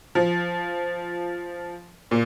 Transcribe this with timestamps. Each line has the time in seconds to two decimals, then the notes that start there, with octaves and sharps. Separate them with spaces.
0.15 F3
2.11 A#2